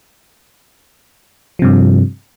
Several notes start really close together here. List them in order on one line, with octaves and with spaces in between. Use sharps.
F3 C3 G2